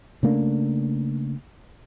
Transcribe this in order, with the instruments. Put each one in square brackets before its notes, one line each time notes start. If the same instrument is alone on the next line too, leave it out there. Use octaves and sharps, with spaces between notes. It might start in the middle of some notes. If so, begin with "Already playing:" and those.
[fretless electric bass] C#3 A3 A#3 D4